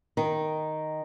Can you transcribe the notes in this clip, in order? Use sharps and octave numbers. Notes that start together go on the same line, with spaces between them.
D#3